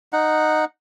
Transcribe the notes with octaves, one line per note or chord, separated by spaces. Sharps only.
D#4 F#5